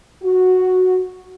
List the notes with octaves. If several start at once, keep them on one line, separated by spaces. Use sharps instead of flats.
F#4